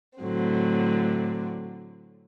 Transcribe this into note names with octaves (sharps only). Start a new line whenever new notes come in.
A2 D3 F#3 C4